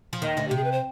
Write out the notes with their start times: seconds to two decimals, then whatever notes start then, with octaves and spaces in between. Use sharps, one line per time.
0.13 F3
0.22 D#2 D#3 D#5
0.37 D2 D3
0.48 G4
0.51 C3
0.57 G#4
0.64 B4
0.72 C5